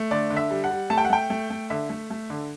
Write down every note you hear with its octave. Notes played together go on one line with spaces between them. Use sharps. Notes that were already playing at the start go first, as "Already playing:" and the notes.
Already playing: A3
D3 D5
D3
E5
G3
F#5
G3
A3 A5
G5
F#5
A3 G5
A3
A3
D3 E5
A3
A3
D3